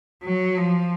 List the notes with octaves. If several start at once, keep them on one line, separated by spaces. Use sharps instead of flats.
F#3
F3